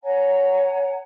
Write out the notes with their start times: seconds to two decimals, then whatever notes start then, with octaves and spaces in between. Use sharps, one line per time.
0.03 C#5 F#5 G#5 A#5